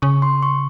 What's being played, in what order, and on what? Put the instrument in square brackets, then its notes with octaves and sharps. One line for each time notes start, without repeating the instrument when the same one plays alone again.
[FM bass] C#3 [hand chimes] C#6
[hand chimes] C6
C#6